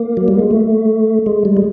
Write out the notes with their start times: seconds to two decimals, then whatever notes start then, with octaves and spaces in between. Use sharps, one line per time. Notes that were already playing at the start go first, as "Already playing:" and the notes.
Already playing: A#3
0.17 F#3
0.28 G3
0.39 G#3
0.51 A3
1.26 G#3
1.45 G3
1.57 G#3